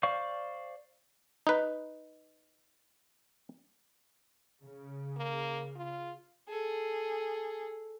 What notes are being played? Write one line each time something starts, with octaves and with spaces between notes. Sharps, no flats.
C5 D5 F5 C#6
D#4 B4
C#3
A#3
F4
G#4 A4